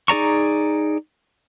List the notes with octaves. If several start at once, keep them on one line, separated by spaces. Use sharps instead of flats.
D#4 G#4 D5 A#5 C#6